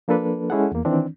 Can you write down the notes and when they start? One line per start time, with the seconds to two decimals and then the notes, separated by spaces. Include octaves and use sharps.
0.08 F3 A#3 D4 A4 B4
0.50 G#3 C#4 E4 G#4 A4 F#5
0.72 E2 A#3
0.85 D#3 E3 C4 D4